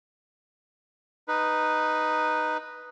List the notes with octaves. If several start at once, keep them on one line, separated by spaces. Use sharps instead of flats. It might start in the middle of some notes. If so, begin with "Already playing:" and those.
D#4 B4